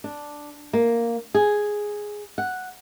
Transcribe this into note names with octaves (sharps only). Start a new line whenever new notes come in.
D4
A#3
G#4
F#5